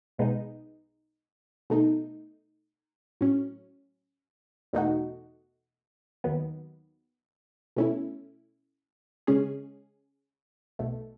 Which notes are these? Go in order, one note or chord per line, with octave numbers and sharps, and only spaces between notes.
B1 B2 G#3 B3 D#4
B2 A3 D#4
A2 F#3 C#4
E2 B2 A3 D#4 F#4
D#2 D#3 F#3 B3
B2 A3 C#4 E4
C#3 G#3 C#4 G#4
B1 B2 A3